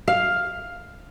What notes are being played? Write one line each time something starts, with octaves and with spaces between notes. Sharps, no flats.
F5